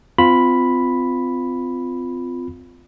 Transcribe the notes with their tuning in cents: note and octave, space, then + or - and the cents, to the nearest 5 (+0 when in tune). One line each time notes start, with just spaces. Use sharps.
C4 -30 F4 +0 B5 +0